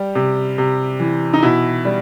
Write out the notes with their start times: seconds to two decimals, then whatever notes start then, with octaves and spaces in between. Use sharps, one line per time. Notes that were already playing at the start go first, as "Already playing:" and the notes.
Already playing: G3 G4
0.15 C3
0.58 C3
1.00 E3
1.33 D#4
1.43 B2 E4
1.85 G3